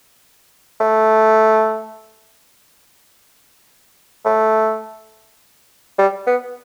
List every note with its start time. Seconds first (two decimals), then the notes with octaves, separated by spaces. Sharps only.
0.80 A3
4.25 A3
5.98 G3
6.27 B3